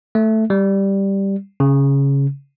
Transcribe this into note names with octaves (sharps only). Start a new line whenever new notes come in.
A3
G3
C#3